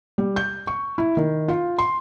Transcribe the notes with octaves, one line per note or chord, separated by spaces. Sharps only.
G3
G6
C#6
E4
D#3
F4
C6